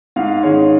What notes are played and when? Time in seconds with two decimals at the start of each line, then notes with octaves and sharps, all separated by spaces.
0.16 G#2 F5
0.43 D#3 G#3 C#4 C#5